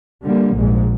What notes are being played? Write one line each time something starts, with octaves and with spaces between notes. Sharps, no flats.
D3 G3 A#3
A#1 G#2 G#3